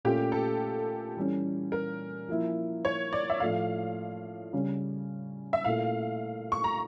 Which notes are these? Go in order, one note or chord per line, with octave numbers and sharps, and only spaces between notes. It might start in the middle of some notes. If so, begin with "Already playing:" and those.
A#2 A3 C#4 F4 G4
A4
E3 G3 C#4
A#4
F3 A#3 E4
C#5
D5
E5
A2 F3 A3 F5
C#3 G3 C#4
E5
A#2 A3 E4 F5
C#6
A#5